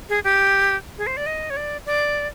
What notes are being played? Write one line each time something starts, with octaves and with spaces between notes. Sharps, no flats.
G#4
G4
G#4
C5
D5
D#5
C#5
D5
D5